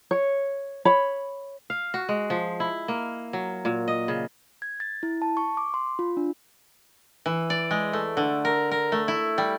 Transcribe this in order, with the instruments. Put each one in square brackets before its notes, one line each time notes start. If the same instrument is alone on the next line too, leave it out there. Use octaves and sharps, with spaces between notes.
[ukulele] C#5
C#5 B5
[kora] F5
F#4
G#3
F3
E4
A#3
F#3
A#2
D#5
C#3
[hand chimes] G#6
A6
E4
A5
C#6
D6
C6
F4
D4
[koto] E3
D5
G#3
A3
D3
A#4
A#4
A3
E4
G3